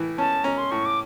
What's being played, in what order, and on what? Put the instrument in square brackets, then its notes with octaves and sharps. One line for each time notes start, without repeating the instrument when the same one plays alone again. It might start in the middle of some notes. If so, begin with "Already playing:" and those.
Already playing: [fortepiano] A2 E3
[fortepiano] C#4 [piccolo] A5
[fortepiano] C#4 [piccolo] A#5
[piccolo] C6
[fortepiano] A2 [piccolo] C#6
[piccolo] D6